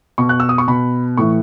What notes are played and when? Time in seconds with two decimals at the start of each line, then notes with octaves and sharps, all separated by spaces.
0.18 B2 C#6
0.29 F#6
0.40 E6
0.49 D#6
0.58 C#6
0.68 B2 B5
1.17 A2 E3 C#6